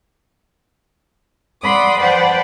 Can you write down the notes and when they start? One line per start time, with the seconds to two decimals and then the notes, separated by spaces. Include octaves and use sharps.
1.62 D5 F#5 B5 C6 D6 D#6
1.99 B4 C5 D5 F#5 G5 A5